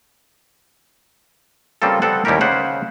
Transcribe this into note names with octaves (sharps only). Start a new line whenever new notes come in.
C#3 G3 A#3 C4 F4 A4
G3 B3 C4 A4 F#5
D#2 G3 C#4 E4 G4 A#4
C#3 B4 C5 F#5